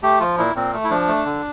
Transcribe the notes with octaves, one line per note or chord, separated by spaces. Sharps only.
A3 G4
F3 F4
A#2 E4
A#2 C4
A3
E4
F3 D4
A3
D3